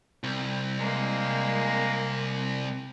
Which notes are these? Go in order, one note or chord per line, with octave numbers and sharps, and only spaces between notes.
C2
G#3 A#3